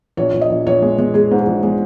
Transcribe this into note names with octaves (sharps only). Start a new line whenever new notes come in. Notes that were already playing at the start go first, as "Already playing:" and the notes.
A#1 C#5
A#1
D#5
A#1
A#1 C#5
G#3
G#3
G#3 G#4
G#2
G#4
A#1
G#3